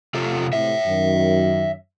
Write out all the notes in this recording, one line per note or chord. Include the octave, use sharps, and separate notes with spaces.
C3 F4 A4
A2 C3 C#5 E5
F#2 D#3